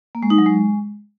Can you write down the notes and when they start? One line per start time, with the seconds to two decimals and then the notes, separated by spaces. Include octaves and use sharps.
0.15 A#3
0.23 G#3
0.30 D#4
0.38 F#3
0.46 G#3